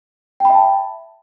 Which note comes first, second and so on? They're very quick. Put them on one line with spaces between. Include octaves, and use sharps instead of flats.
G5 B5 E5 A5